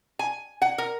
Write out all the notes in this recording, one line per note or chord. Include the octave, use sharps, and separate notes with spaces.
G#5
F#5
A#4